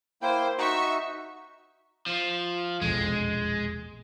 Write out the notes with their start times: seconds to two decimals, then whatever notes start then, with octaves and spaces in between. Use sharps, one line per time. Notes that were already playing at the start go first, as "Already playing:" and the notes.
0.22 A#3 E4 C5 G5
0.58 D#4 F#4 E5 C#6
2.06 F3
2.81 E1 A#1 F2 G#3